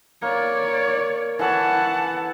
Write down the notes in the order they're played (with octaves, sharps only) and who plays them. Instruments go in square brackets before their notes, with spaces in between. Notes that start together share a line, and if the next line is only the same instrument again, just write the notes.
[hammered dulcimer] A#3 [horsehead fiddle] C#5 D5
[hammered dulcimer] E3 A4 C#5 [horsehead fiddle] F#5 A5